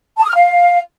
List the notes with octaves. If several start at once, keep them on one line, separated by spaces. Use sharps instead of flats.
A5
D#6
F6
F5